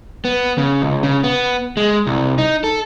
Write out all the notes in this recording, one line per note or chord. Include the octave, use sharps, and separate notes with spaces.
B3
C#3
C#2
C#3
B3
G#3
C2
D#4
A4